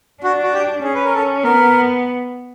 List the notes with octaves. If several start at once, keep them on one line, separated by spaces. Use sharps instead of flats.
D4 F#4
F#4
G4
C#4 G#4
B4
A#4
A4
B3 A#4